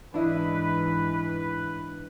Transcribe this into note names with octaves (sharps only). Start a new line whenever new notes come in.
G#2 E3 D4 E4 B4 D#5